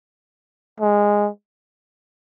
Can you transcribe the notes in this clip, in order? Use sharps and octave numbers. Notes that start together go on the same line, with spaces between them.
G#3